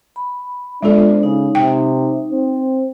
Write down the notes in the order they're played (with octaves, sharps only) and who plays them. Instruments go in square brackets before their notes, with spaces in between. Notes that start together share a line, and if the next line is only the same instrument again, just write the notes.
[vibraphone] B5
[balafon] G#3 A4 [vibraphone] B3 F4 C5 [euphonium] D4
[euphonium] C#3 [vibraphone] D#4
[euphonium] C3 [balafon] G5
[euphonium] C4